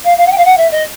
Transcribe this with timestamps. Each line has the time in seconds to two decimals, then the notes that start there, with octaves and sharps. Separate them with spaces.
0.04 F5
0.17 F5
0.26 F#5
0.31 G5
0.38 F5
0.45 F#5
0.57 E5
0.71 D#5